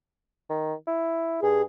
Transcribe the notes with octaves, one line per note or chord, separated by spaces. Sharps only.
D#3
E4
G2 G#4